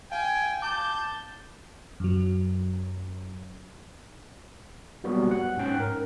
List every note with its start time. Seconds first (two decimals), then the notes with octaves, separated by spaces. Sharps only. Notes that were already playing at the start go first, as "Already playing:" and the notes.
0.12 F5 G5 G#5
0.62 A5 D6 G6
2.00 F#2 F#3
5.04 F#3 G3 A#3 B3 F#4
5.31 F#5
5.57 G#2 C#4 G5 F#6
5.80 A#4